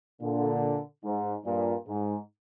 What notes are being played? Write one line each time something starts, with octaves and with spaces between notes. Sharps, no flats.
A#2 D3
G#2
G2 A#2
G#2